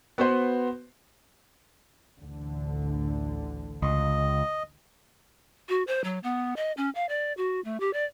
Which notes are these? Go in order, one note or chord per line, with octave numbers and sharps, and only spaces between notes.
B3 F#4 B4 C5
A1 D2 D3
C#2 D#5
F#4
C5
F#3
B3
D#5
C#4
F5
D5
F#4
A3
G4
D5